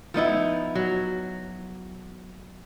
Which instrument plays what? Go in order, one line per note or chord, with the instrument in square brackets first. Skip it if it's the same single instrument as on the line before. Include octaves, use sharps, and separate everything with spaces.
[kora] F3 B3 D#4 E4
F#3